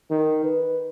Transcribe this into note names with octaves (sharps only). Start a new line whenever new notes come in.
D#3
B4